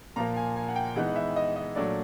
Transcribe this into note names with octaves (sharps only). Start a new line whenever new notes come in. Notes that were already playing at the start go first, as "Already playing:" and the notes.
A#2 F3 A#3 A#5
G#5
G#5
F#5
G5
E3 G#3 B3 D#4 F#5
D#5
E5
D#5
D#5
A#2 F#3 A3 D4 D5